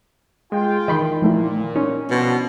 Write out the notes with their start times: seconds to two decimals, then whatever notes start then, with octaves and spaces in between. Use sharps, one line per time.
0.52 G#3 F4 G5
0.88 D#3 E3 D#5 B5 C6
1.22 A#2 F3 A3 E4
1.76 C#4 D#4
2.11 C2 B2 D3 F3